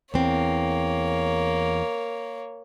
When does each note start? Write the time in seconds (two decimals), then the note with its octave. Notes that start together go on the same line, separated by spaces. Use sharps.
0.14 E2 A#3 C4 C#5